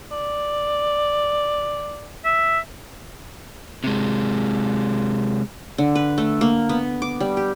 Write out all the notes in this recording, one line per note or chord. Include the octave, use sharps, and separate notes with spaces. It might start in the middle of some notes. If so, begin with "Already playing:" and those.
D5
E5
C3 G#3
D3
B4
A3
A#3
B3
D6
G3
G4